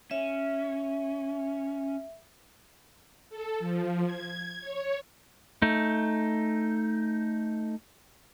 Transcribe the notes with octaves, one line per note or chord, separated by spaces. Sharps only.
C#4 E5
A4
F3
G#6
C#5
A3 D#4